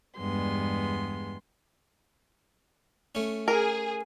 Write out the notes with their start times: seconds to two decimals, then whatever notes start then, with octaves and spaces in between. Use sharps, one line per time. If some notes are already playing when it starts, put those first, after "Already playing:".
0.19 E2 G2 G#3 B3 C6
3.15 A3 C#4
3.48 G#4 A#4